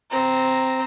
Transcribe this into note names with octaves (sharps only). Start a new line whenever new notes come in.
C4 A#5